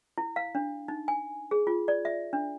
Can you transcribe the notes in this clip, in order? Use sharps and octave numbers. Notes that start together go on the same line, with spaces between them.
E4
F5
D4
D#4
G#5
G#4
F4
D5
E5
D4